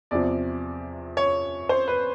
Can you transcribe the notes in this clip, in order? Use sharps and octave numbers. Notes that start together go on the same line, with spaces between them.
E2 C3 F3 D5
C#5
C5
B4